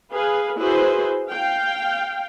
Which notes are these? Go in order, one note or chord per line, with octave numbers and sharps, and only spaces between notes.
G#4 B4 F5
E4 F#4 G#4 B4 C5
F5 G5